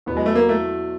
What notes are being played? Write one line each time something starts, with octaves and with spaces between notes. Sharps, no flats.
E2 B2 F#3 B3
G#3
A3
A#3
A3